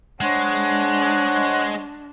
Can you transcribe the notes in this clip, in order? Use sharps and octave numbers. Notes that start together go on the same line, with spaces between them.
G#3 D4 C5 C#5 F#5